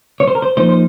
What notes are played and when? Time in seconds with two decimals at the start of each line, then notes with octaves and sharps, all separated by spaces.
0.20 C#5
0.28 C5
0.35 A#4
0.42 C5
0.57 F3 A#3 D#4 C5
0.69 C5